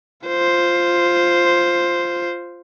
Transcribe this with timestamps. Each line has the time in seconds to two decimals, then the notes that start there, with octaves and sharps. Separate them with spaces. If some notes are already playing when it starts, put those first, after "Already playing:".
0.27 F4 C5